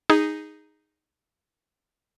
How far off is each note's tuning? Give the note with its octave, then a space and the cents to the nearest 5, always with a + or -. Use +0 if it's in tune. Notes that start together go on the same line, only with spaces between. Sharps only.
D#4 +0 G#4 -10